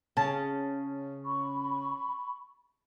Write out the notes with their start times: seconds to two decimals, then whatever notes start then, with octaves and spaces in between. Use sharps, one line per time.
0.17 C#3 A5
1.25 B5 C#6